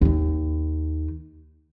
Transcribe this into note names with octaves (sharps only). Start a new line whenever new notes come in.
D#2 D#3